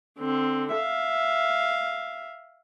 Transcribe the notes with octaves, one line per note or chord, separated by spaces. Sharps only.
D3 C4
E5 F5